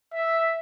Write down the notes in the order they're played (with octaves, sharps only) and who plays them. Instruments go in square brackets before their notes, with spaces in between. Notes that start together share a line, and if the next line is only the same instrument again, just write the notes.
[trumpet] E5